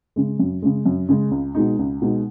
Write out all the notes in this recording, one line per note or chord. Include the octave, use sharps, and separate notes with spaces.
C#3 G#3
F#2
C#3 G#3
F#2
C#3 G#3
C#2
B2 G#3 D#4
C#2
B2 G#3 D#4